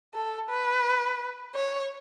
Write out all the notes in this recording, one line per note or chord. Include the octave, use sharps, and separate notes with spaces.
A4
B4
C#5